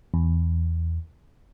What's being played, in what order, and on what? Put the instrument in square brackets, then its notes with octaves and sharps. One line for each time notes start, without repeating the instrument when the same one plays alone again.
[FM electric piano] E2